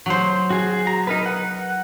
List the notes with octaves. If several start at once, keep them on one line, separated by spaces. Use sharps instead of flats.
F#3 C5
F#4 G#4
A#5
D#4 A#4 B4
F#5